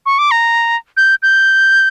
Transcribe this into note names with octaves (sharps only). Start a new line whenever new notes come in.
C#6
D6
A#5
G6
G6